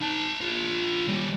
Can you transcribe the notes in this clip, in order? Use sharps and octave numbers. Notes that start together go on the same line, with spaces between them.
D#4 A5
D4 F4
D#3 G3